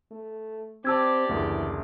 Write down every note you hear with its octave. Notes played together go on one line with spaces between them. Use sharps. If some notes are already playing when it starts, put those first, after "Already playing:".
A3
C4 G4 D5 A5 E6 G#6
F#1 D2 E3